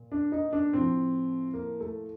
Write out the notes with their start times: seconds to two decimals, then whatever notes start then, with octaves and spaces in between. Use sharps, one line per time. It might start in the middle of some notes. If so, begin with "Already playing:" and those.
Already playing: A#2
0.12 D4
0.32 D#4
0.53 D4
0.73 A2 F3 C4
1.54 A#3
1.80 A3